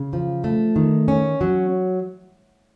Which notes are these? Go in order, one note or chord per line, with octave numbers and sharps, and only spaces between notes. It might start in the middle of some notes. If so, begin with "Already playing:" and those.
Already playing: C#3
F3
A3
D#3
C#4
F#3